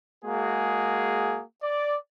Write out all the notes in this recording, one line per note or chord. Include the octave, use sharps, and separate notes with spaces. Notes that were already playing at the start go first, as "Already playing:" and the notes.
G#3 A#3 F#4 G#4
D5